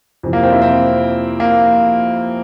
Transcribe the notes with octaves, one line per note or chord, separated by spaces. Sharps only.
F2 C3 E3
A#3
C4
E4
C4
A#3